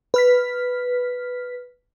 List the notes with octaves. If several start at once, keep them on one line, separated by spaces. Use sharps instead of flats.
B4 F6 B6